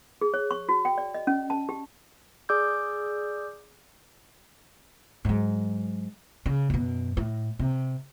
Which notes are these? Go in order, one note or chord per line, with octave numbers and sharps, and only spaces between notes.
G#4
C#5
C#6
F#4
G5
D5
D#5
C#4
A5
G4
G#4 D5 D6 E6 G6
G#2 F#3
C#3
F#2 B2
A2
C3